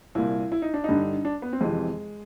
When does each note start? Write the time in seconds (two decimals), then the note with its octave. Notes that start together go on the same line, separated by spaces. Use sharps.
0.15 C2 A#2 E4
0.52 E4
0.62 D#4
0.74 D4
0.84 G2 D3 D#4
1.25 D4
1.42 B3
1.53 C4
1.61 F2 C3 E3 G#3